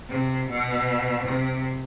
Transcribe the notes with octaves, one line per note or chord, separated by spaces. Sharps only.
C3
B2
C3